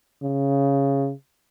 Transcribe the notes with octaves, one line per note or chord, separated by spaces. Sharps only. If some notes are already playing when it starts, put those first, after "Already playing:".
C#3